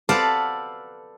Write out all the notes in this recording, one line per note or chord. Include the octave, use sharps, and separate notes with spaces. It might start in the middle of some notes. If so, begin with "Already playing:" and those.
A4 B4 C5 D5 F5 F#5